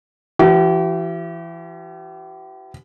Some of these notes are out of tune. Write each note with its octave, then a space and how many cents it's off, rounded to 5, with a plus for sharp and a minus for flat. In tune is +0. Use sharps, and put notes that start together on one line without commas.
E3 +30 G4 -45